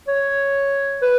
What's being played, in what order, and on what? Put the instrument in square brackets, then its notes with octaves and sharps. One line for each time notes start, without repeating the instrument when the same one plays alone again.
[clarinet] C#5
B4